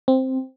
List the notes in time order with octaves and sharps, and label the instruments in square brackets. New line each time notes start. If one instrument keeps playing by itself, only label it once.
[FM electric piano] C4